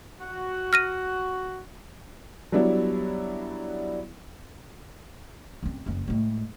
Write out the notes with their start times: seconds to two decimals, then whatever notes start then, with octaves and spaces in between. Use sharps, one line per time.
0.20 F#4
0.73 F6 A#6 D#7
2.52 F#3 G3 B3 D4 E4 F#4
5.63 F#2 C4
5.86 F#1 F2
6.08 A2 G#3